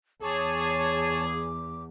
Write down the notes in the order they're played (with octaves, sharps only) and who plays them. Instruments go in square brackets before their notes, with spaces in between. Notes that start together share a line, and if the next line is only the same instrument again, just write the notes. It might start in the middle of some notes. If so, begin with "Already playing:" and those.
[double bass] E2 [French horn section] G#4 [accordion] C#5 A5 [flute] D6